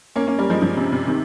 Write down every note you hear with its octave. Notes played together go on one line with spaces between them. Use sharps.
A#3 C#4
A#3 C#4
G3 A#3
F3 G#3
C#3 F3
C3
C3
C3 D#3